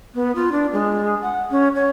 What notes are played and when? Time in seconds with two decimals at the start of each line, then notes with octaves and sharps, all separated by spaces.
0.14 B3
0.35 F4
0.52 D4
0.73 G#3
1.21 F#5
1.51 C#4
1.75 C#5